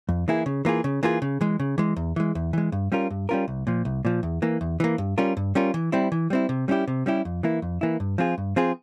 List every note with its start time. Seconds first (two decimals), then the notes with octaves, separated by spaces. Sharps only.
0.09 F2
0.28 E3 A#3 E4 G#4
0.46 C#3
0.65 E3 A#3 F4 G#4
0.84 C#3
1.03 E3 A#3 F4 G#4
1.22 C#3
1.41 E3 G#3
1.60 C#3
1.78 E3 G#3
1.97 E2
2.16 E3 G#3
2.35 E2
2.53 E3 G#3
2.72 G2
2.92 G3 C#4 F4 A#4
3.10 G2
3.29 G3 C#4 F4 A#4
3.48 C2
3.67 A#2 F3
3.85 C2
4.05 A#2 F3
4.23 E2
4.42 E3 A#3
4.61 E2
4.80 E3 A#3
4.98 G2
5.18 G3 C#4 F4 A#4
5.37 G2
5.55 G3 C#4 F4 A#4
5.74 E3
5.92 G3 C4 E4
6.12 E3
6.30 G3 C4 E4
6.49 C3
6.68 G3 C#4 E4 G4
6.88 C3
7.06 G3 C#4 E4 G4
7.25 F2
7.43 E3 A#3 E4
7.62 F2
7.81 E3 A#3 E4
8.00 G2
8.18 F3 C4 F4 G#4
8.38 G2
8.56 F3 C4 F4 G#4